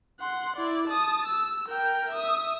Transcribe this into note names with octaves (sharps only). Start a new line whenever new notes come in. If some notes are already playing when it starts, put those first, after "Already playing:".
F#5 C6
E4 D5
A5 D#6
E6
A#4 G5
E5 D#6